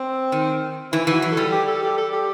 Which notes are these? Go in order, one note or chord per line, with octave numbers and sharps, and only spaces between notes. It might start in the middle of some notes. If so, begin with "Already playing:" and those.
Already playing: C4
D#3
E3 E4
E3 F#4
F#3
A4
G3
G4
A4
G4
A4
G4